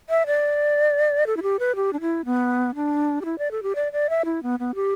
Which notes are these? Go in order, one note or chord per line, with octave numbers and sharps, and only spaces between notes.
E5
D5
A4
E4
G4
B4
G4
D4
E4
B3
D4
G4
E4
D5
A4
G4
D5
D5
E5
E4
B3
B3
G4